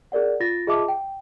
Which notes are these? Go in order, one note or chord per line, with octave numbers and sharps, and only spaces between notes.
G#4 A#4 D5 F#5
F4 A6 A#6
F4 G#4 D#5 E5 A5 D6
G5